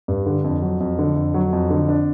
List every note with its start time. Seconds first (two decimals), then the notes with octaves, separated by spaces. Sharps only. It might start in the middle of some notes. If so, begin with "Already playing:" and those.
0.08 G2
0.26 D3
0.44 F2
0.62 F#3
0.80 F2
0.98 D3
1.16 F2
1.34 F#3
1.53 F2
1.70 D3
1.89 D4